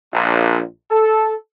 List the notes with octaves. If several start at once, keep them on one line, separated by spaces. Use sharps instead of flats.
A#1
A4